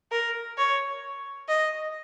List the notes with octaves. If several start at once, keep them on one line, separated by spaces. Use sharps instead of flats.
A#4
C#5
D#5